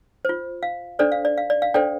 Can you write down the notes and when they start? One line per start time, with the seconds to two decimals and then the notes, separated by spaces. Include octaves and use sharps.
0.25 F4 C5
0.63 F5
0.99 D4 A4 C5 D5
1.12 F5
1.25 D5
1.38 F5
1.50 D5
1.62 F5
1.74 D4 A4 C5 D5 G5